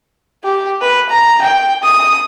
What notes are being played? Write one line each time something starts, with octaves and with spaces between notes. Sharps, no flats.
G4
B4
A#5
G5
D#6